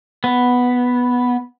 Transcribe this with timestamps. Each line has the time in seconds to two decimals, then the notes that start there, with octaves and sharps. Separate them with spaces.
0.24 B3